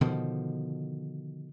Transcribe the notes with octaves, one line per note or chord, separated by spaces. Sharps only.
B2 D3 D#3 F3